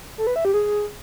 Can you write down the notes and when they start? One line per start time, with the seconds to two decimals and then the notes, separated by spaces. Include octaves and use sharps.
0.18 A4
0.27 B4
0.36 E5
0.45 G4
0.54 G#4